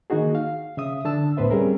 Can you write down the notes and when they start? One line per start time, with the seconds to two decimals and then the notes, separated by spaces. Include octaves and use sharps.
0.10 D#3 A#3 D#4 F#4 G#4
0.35 F5
0.77 C#3 E5 D#6
1.05 D3 D4 A5 E6
1.37 C#2 A2 B3 B4 C5 E5
1.51 G3 C4 C#4 G#4 A#4